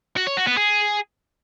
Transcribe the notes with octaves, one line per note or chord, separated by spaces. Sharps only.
F#4
C#5
F#4
B3
G#4